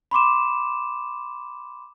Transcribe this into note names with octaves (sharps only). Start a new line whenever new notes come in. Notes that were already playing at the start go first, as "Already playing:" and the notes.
B5 C6 D6 E7